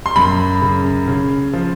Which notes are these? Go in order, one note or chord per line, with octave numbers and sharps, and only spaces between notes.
C6
F#2 B5
C#3
C#3
F3